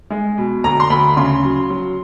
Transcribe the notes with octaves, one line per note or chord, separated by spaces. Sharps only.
G#3
B2
D2 A#5
C6
D2 B5
C#3 C6
F#3
F#3